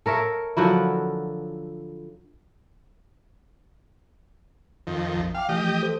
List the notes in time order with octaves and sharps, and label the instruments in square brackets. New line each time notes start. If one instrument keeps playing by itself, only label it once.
[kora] A4 A#4 C#5 E5
D3 F3 F#3 E4
[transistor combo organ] F2 D#3
[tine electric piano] A#1 F3
[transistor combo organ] F5 [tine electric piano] G5 G#5 D6
[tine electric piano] E3 F3 A3 [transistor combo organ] G4 D#5
[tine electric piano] G4 A4 C5